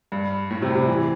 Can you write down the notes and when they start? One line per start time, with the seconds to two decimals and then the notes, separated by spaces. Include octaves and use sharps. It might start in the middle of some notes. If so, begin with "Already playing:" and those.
0.12 G2
0.51 A2
0.62 C3
0.75 C3
0.88 E3